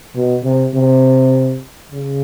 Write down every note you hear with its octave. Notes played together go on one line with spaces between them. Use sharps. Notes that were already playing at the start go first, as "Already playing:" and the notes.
B2
C3
C3
C#3